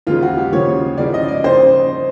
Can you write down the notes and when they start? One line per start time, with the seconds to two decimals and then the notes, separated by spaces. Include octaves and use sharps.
0.07 D#2 C#3 F3 G#3 F4
0.22 F#4
0.37 G4
0.52 D#2 C#3 F3 G#3 C#5
0.98 D#2 C#3 F3 G#3 D5
1.14 D#5
1.28 D5
1.44 C#3 C5